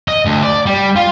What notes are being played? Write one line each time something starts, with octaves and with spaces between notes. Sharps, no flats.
D#5
D2
D5
G3
F4